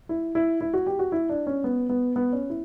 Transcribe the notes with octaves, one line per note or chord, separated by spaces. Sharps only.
E4
E4
E4
F#4
G4
F#4
E4
D4
C#4
B3
B3
B3
C#4
E4